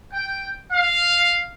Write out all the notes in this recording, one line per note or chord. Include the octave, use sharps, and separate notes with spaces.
G5
F5